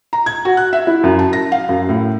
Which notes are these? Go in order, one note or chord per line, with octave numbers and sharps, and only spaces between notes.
A#5
G#6
F#4
F#6
E5
E4
F#2
A5
A#6
F5
F#2
A2